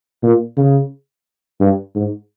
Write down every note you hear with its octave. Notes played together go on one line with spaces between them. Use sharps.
A#2
C#3
G2
G#2